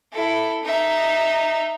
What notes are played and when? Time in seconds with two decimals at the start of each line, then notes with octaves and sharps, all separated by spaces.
0.12 E4 A4
0.63 D#4 E5